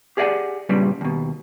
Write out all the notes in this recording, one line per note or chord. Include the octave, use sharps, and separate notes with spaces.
G4 G#4 D5 D#5 F#5 G#5
G2 A#2 C#3 G3 B3
D#2 B2